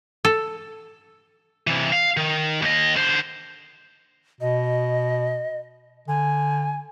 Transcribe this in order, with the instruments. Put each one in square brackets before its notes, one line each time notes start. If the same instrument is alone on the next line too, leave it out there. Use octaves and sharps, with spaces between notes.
[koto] A4
[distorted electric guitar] C3 E3
F5
D#3
D#2 D#5
D3 C5
[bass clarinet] B2 [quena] D#5
[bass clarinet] D3 [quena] G#5